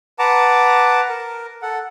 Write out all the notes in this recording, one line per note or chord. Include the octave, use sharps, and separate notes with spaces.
B4 F#5 A5 A#5 D6
A#4
A4 F#5